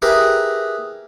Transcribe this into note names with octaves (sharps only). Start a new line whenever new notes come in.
E4 G4 G#4 A#4 B4